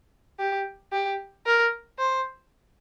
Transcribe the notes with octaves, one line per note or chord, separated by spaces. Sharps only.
G4
G4
A#4
C5